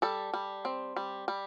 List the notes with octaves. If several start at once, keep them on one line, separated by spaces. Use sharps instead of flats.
G3 A4
G3
C4
G3
G3